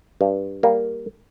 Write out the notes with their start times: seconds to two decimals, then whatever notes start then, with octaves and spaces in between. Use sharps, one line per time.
0.21 G2
0.63 G3 A#3